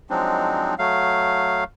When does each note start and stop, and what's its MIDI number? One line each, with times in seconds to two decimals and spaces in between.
0.10 0.75 53
0.10 0.75 54
0.10 0.75 56
0.10 0.75 60
0.10 0.75 62
0.10 0.75 63
0.79 1.64 54
0.79 1.64 57
0.79 1.64 77